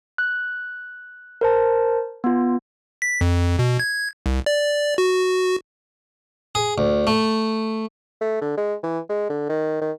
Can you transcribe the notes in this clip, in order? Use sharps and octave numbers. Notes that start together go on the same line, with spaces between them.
F#6
A#4 C5 A5
B3 F4
B6
F2
B2
G#6
C2
D5
F#4
G#4
D2
A3
A3
D3
G#3
E3
G#3
D3
D#3
D#3